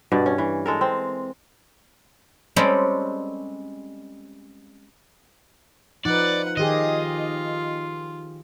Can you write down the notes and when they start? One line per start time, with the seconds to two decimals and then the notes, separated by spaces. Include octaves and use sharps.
0.12 G2 B2 D5
0.26 C#4
0.38 E3
0.66 G#3 A4 A#4
0.81 C4
2.56 G3 G#3 C4 C#4 G4 A4
6.05 F3 D#4 B4 D5 F#5
6.57 D#3 F4 G4 G#4 D#5